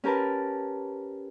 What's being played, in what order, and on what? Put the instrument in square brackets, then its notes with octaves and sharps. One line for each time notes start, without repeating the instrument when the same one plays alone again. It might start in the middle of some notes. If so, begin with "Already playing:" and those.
[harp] C#4 G4 A#4 B4 A5